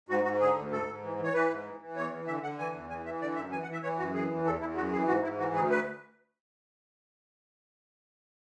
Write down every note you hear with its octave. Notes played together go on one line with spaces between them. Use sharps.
G#2 F#4
G#2 F#4
D3 G#4
D2
G#2 A4
G#2
E3
E3
C#5
E3 B4
G#2
E3
E3
E2 C#5
E3
D3 E5
D3 F#5
E3 G#5
E2
E3 G#5
E3 E5
D3 D5
F#2 E5
E3 G#5
F#5
E3 E5
E3 C#5
F#2 F#4
E3 G#4
E2
E2 A4
E2 E4
F#2 F#4
E3 G#4
G#2 F#4
G#2 E4
E3 F#4
D2 G#4
B4